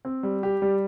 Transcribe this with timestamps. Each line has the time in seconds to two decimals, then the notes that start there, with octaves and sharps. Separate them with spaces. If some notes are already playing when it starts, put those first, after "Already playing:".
0.05 C4
0.23 G3
0.43 G4
0.62 G3